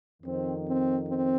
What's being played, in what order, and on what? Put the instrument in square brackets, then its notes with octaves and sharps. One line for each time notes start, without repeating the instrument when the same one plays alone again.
[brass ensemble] F2 D#3 C4
C4
C4